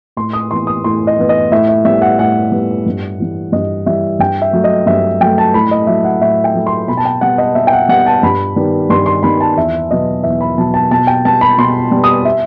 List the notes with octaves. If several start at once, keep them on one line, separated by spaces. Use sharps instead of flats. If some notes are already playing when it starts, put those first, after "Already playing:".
A2 C6
D#6
E3 B3 C6
D#6
A2 C6
D#5
E3 B3
D#5
A2 E5
E5
G3 B3 E5
F#5
A2 F#5
G3 B3
G2
E3 G3
G2 D#5
E3 G3 E5
G2 G5
E5
F#3 A3
D#5
G2 E5
F#3 A3 G5
A5
A2 B5
D#5
F#3 A3 E5
F#5
A2 E5
G5
F#3 A3
C6
B2 B5
A5
G5
G3 B3 F#5
D#5
B2 E5
G5
F#5
G3 B3 F#5
A5
G2 B5
D#3 G3 B3
G2 C6
C6
D#3 G3 B3 B5
A5
E2 E5
B2 F#3 B3 D#5
E2 E5
B5
B2 F#3 B3 A5
A5
B2 A5
G5
G3 B3 A5
B5
B2 C6
G3 B3
D#6
E5